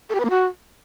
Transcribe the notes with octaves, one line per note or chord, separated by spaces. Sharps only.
A4
G4
B4
A#3
F#4